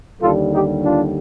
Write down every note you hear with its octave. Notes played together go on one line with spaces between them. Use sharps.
D#2 D3 G3 F4 A4
D#4 G4
D4 F4